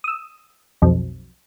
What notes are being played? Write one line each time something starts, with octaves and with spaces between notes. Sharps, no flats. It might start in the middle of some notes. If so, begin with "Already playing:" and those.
D#6 E6
B1 F2